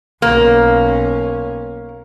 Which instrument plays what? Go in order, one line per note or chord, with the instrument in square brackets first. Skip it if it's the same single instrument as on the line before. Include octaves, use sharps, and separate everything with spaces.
[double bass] B1 C#4 [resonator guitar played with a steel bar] A#3